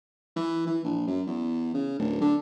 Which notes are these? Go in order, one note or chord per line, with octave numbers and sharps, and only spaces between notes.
E3
E3
A#1
F#2
E2
C#3
D1
D3